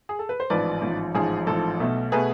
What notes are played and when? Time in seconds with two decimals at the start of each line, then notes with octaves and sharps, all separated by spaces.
0.09 G#4
0.19 A4
0.29 B4
0.40 C5
0.50 A1 G#2 F3 B4 D5
0.82 A1 G#2 F3
1.15 A1 G#2 F3 G#4
1.47 A1 G#2 F3 A4
1.80 B1 B2 A3
2.12 B2 A3 G#4 B4